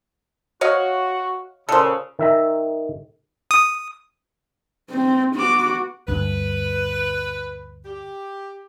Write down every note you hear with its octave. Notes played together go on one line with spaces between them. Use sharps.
F#4 C#5 D#5 F5
A#2 C#3 A4 C5
D#3 E5 A#5
D#6
C4
B3 F#4 D6
D2 G2 B4
G4